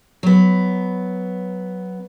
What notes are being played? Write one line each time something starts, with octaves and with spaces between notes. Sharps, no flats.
F#3 B3